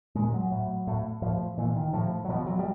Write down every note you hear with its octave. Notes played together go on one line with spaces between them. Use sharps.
A#2 G#3
F#3
A2
A2
A2 F3
A#2 E3
D#3
A2 F3
F#3
B2 F3
F#3
G3